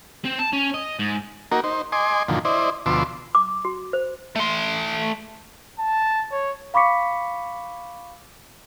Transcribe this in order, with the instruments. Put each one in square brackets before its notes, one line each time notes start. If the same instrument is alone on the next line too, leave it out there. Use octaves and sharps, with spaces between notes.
[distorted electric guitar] C4
A5
C#4
D#5
G#2
[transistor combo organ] A#3 D#4 F#4 A#4
D#4 C5
D#5 G#5 C6 D6
F#2 A#2 D3 D#3 F3
E4 C5 D5 D#5
D2 B2 F3 C6 D6 E6
[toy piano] D6
F#4
C5
[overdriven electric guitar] A3 C6
[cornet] A5
C#5
[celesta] F5 B5 C#6 D6 B6 C#7